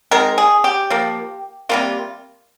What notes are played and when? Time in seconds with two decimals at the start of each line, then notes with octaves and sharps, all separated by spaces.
0.11 D#3 G#3 C4 A#4
0.38 G#4
0.64 G4
0.90 F3 A#3
1.69 C3 G3 A#3 F4